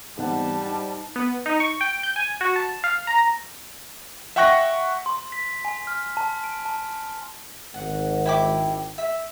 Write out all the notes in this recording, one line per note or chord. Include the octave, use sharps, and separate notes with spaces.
G#2 E3 G3 B3 C4 F#5 A5
D#4
B3
D#4
C#6
G5
G6
G#5
F#4
A5
F5
A#5
E5 F#5 G5 C#6 F#6 A#6
C6
B6
G#5
F6
A5
D7
A5
G#1 F#5
E4 G5 D6
E5